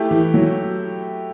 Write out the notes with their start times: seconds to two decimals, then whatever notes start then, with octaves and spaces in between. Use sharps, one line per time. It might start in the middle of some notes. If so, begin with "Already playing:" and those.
Already playing: A3 E4 G4
0.11 E3
0.34 F#3